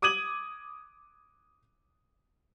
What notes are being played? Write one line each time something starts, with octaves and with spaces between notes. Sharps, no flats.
D6 D#6 G#6 D#7 F#7